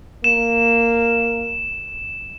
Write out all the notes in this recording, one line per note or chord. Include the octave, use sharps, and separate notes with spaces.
A#3 E7